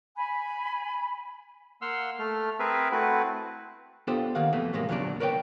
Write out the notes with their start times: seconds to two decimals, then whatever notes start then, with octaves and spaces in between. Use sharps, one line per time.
0.16 G#5 B5
1.82 A#3 F5 F#5 C6 E6 F6
2.19 A3 F6
2.59 C4 G#4 A#4 B4 E5
2.92 A3 C4 E4 F#4 B4
4.07 B3 D4 F4 G4 A4 C5
4.35 D#3 A#3 F5 F#5
4.53 F2 B2 E3 A3
4.73 A2 C3 E3 G#3 A#3
4.89 E2 A#2 D3 F#3 D4 D5
5.20 A#4 B4 C#5 D5 G5